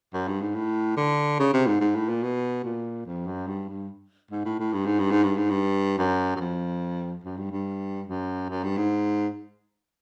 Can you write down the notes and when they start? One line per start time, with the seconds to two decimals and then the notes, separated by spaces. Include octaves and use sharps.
0.13 F#2
0.27 G2
0.41 G#2
0.55 A2
0.97 D3
1.39 C#3
1.53 C3
1.67 G#2
1.81 G#2
1.95 A2
2.09 A#2
2.22 B2
2.64 A#2
3.06 F2
3.27 F#2
3.47 G2
3.69 G2
4.31 G#2
4.45 A2
4.60 A2
4.73 G2
4.86 G#2
4.99 G2
5.11 G#2
5.23 G2
5.37 G#2
5.50 G2
5.99 F#2
6.36 F#2
6.40 F2
7.23 F#2
7.37 G2
7.51 G2
8.07 F#2
8.49 F#2
8.63 G2
8.77 G#2